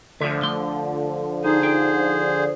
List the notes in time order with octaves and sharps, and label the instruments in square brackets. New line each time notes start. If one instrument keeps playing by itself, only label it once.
[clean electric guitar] D2 E5 [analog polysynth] D3 F3
[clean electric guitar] A3 C6
[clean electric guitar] D#4 [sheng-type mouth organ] G#4 C5
[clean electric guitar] D#4 G5